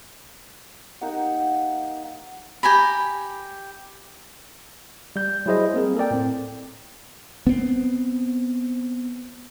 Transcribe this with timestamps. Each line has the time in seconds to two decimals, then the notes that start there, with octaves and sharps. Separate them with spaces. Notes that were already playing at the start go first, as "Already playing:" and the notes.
1.01 A#3 D#4 G4 F#5
2.63 G4 G#5 A#5 B5
5.16 G3 G6
5.46 F#3 G3 E4 G#4 C5 D#5
5.74 A#3 C4 G#4 A#4
5.97 A4 A#4 D5 G5
6.11 A2 C4
7.47 B3 C4